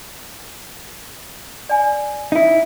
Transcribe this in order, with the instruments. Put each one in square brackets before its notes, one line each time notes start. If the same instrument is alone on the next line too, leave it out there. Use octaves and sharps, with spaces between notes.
[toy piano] D5 G#5
[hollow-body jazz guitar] D#4 E4